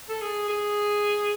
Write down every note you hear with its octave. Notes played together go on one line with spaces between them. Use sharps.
A4
G#4
G#4